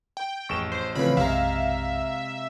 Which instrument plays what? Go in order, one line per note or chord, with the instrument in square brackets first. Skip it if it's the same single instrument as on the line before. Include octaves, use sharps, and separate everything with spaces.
[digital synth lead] G5
[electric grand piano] A1 E7 [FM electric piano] F2 G#4 C#6
[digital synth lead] C5
[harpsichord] C#3 E3 F3 [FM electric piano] A3 C4 F4 [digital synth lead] B5
[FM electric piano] B1 F#2 [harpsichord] C3 G#3 [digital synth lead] E5 [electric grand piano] F5 A#5